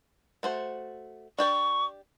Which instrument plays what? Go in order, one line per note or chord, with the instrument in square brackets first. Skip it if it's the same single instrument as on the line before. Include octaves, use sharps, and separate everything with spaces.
[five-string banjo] A3 F#4 C5
[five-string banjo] D4 G4 D5 [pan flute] C#6